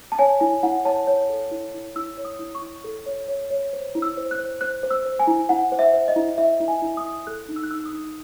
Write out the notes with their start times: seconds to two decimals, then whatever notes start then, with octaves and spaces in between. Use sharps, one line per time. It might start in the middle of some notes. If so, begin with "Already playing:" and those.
0.12 A5
0.19 C#5 G#5
0.40 E4 G#5
0.63 E4 F#5
0.85 C#5 A5
1.07 C#5
1.29 A4
1.51 E4
1.74 E4
1.96 E4 E6
2.17 C#5
2.25 D#6
2.39 E4
2.55 C#6
2.62 E4
2.84 A4
3.06 C#5
3.28 C#5
3.50 C#5
3.73 C5
3.95 E4
4.02 E6
4.17 C5
4.31 F#6
4.39 C5
4.61 C5 F#6
4.83 C5
4.91 E6
5.05 C5
5.19 G#5
5.27 E4
5.49 E4 F#5
5.72 C5
5.79 E5
5.93 C5
6.08 D#5
6.16 E4
6.38 E4 E5
6.60 E4
6.68 G#5
6.82 E4
6.97 D#6
7.04 E4
7.27 A4 F#6
7.49 D#4
7.56 E6
7.63 F#6
7.71 D#4 E6
7.85 D#6
7.93 D#4